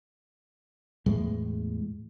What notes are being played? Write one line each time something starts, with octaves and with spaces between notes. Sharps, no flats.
E2 A2 G#3